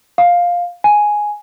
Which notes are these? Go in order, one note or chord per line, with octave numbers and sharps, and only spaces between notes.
F5
G#5